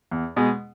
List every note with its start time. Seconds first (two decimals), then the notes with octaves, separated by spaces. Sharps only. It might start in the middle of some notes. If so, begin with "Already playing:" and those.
0.11 E2
0.36 B2 G#3